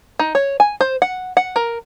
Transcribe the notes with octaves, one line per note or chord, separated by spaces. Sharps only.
D#4
C#5
G#5
C5
F#5
F#5
A#4